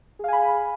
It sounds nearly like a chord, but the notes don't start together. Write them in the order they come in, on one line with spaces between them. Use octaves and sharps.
G#4 F5 G#5 B5